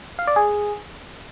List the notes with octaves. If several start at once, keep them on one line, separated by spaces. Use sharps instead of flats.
F5
D5
G#4